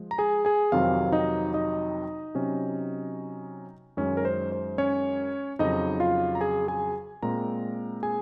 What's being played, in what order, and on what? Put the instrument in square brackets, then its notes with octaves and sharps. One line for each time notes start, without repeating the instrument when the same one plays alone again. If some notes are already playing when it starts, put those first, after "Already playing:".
Already playing: [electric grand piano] F3 G#3
A#5
G#4 G#5
G#4 G#5
F2 C3 D#3 F#3 C4 F4 F5
D#4 D#5
D#4 D#5
C3 F#3 C#4
F#2 D#3 G#3 C#4 C#5
A#4
C5
C5
C#4 C#5
F2 C#3 F#3 D#4 D#5
F4 F5
A#5
G#4 G#5
G#4 G#5
A#2 G#3 C4 A#4 A#5
G#4 G#5